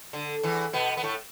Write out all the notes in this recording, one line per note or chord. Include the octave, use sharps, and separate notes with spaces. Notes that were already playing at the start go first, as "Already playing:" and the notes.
D3
E2 E3
B2 B3
B3
A2 A3